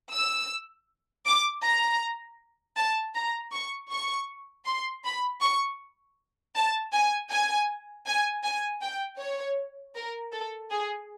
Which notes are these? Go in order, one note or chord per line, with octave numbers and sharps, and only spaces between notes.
E6
D6
A#5
A5
A#5
C#6
C#6
C6
B5
C#6
A5
G#5
G#5
G#5
G#5
G5
C#5
A#4
A4
G#4